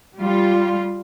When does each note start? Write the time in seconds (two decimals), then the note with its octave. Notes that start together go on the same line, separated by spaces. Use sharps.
0.18 G3 F4